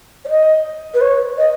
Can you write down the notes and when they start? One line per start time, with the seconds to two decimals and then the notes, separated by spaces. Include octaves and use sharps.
0.25 C#5
0.28 D#5
0.94 B4
1.01 C#5
1.38 D#5